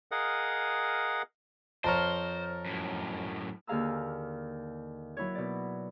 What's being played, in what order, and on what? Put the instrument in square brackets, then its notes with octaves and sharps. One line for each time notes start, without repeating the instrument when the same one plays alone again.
[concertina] G#4 A#4 D#5 F5 F#5
[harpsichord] F2 A#4 C#5 [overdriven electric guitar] C5 [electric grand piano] A5 A#5 F6
[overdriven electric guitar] F#2 A2
[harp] D#2 D3 G#4 F5 A#5 E6
F#3 E4 C#5
B2 D5